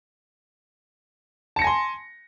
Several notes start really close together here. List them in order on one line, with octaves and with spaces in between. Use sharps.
A5 C#7 A#6 G#5 C6